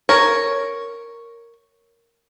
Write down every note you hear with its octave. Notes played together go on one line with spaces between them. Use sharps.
A#4 C#5